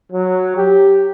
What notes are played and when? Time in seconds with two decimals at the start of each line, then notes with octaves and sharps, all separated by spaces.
0.12 F#3
0.57 G4